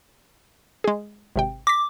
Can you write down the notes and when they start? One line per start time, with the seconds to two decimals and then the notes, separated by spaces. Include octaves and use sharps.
0.84 G#3 G#4
1.36 G#1 C3 G5
1.67 D6 A#6 B6